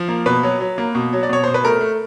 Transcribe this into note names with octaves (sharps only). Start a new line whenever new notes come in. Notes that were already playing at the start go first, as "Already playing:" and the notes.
Already playing: F3
A#3
B2 B4
F#3
F#3
A#3
B2
F#3
D5
B2 C#5
B2 C5
B4
A3 A#4
A3